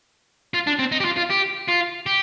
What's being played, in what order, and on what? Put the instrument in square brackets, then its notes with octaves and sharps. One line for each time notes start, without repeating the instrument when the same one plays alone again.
[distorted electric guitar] F4
D4
C4
D#4
G4
F4
F4
G4
F4
G4